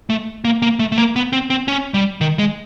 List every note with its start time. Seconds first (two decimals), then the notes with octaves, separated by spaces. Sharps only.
0.10 A3
0.45 A#3
0.62 A#3
0.79 A3
0.92 A3
0.98 A#3
1.16 B3
1.33 C4
1.50 C4
1.68 C#4
1.94 G3
2.21 D#3
2.39 G#3